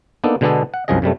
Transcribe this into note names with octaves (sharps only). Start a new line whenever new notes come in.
A#3 B3 D4 D#4 A4
B2 D3 G#3 B3 D4 A4
F#5
C2 F#2 F3 G#4 D#5
F#2 C3 G3 A3